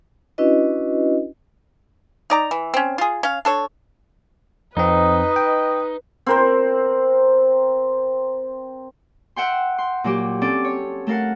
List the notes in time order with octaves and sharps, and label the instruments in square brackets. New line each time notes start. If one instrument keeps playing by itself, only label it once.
[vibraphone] C#4 D4 E4 F#4 B4 D#5
[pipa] D#4 D5 A#5
E3
C4 C#4
F4 G#4
C#4 F5
D4 A4 C#5
[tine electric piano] F2 C4 [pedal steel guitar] D#4 [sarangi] B4 [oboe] D#5
[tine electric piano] G5
[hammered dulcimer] C4 A#4 C5
[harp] E5 F#5 G5 C6
C6
A#2 F#3 G4
C4 C#4 A4 D5
C#5
A3 A4 A#4 F5 F#5